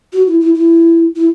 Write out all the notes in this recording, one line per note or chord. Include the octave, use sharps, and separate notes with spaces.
F#4
E4
E4
E4
E4